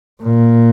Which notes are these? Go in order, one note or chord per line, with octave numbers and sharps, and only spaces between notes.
A#2